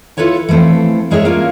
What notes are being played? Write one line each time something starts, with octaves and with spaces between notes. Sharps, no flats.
E4 F4 A4 B4 C#5 G#5
E3 F3 A3 C4
G2 G#3 G#4 A#4 C#5 E5
A#3 C#4 F4 A#4